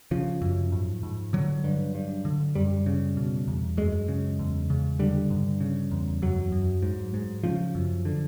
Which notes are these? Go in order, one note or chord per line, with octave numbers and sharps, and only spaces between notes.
C#3 F3
F#2
G#2
G#2
D3 F#3
G2
G2
D3
F#2 G3
C#3
B2
E2
F#2 G#3
C#3
E2
C#3
D3 G3
G2
C#3
E2
F#2 F#3
F#2
G#2
G#2
C#3 F3
F#2
D3